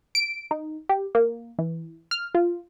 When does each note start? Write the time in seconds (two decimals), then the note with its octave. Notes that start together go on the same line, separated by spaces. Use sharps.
0.15 D7
0.51 D#4
0.89 G4
1.15 A#3
1.59 E3
2.11 F6
2.35 F4